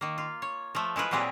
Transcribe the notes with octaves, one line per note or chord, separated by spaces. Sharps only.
D#3 A#3
F4
C#5
F3 A3
G#3 E4 F4 B4
A#2 F#3 G3 C4 G4 G#4